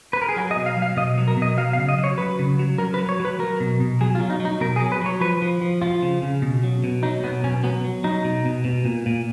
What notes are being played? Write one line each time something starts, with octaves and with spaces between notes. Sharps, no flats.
B4
A#4
G#4
F#3 F#4
D#5
B2
F5
F#3
F5
B2 D#5
F#3
A#4
B2
D#5
F#3 F5
F5
C#3
D#5
F#3
C#5
F#3 B4
C#3
F#3
F#3 A#4
B4
F#3
C#5
F#3 B4
F#3 A#4
B2
B2
F#3 G#4
F4
F#3
D#4
F#3
D#4
B2 A#4
G#4
F#3
B4
F#3 C#5
F3 B4
F3
F3
F3 F4
C#3
C#3
B2
F#3
B2
F#3 D#4
B2 B3
B2 C#4
F#3 B3
F#3
F#3 D#4
B2
B2
B2
A#2
A#2